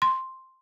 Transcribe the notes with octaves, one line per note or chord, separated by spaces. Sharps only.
C6